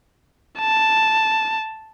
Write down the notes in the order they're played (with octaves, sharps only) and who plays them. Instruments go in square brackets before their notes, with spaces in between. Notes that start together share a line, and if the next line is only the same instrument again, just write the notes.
[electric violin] A5